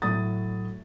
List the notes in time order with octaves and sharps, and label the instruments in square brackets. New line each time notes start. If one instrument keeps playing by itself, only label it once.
[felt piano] A2 F#3 D#6 A6